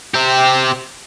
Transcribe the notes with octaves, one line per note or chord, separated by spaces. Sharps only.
C4 G4